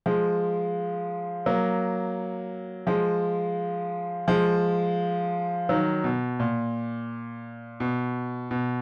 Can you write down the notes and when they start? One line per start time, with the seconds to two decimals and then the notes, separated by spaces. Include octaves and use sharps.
0.06 F3 G#3
1.46 F#3 A#3
2.87 F3 G#3
4.28 F3 G#3
5.69 D#3 F#3
6.04 B2
6.40 A#2
7.80 B2
8.51 B2